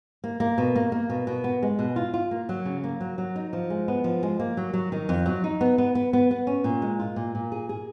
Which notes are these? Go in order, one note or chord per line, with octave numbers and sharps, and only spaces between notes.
A#3
A#3
B2
A#3
A#3
B2
B2
B3
G#3
B2
F4
F4
A#3
F#3
C#3
A#3
F#3
F#3
D#4
F3
G#3
B3
F3
G#3
A#3
F#3
F#3
D#3
F2
F#3
D#4
B3
B3
B3
B3
B3
C#4
A#2
G#3
F4
A#2
A#2
G#4
G#4